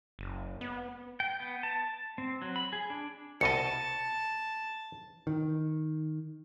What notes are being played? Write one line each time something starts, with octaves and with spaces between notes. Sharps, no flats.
F#1
B3
G5
B3
A5
C4
F#3
B5
G#4
D4
C2 B2 D#5 A5 C#7
D#3